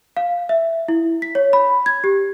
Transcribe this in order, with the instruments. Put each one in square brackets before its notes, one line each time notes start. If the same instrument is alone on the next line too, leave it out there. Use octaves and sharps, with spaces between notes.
[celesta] F5
E5
E4
B6
C#5
B5
G#6
G4